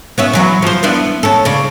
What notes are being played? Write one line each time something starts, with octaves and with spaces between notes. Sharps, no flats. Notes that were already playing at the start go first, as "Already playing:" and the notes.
B3 C#4 E4
E3 F#3 F#4
F3 C5
B3 D4 E4
C#4 A4
C#3 D4